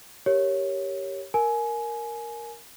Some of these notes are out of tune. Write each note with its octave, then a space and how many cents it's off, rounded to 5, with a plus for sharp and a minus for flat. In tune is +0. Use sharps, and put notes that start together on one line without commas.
G4 +0 A#4 +0 C#5 +0
A#4 +0 G#5 +20